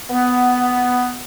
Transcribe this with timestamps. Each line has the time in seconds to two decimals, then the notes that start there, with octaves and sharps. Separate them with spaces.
0.10 B3